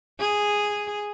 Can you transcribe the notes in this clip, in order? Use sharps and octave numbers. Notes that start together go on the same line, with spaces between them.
G#4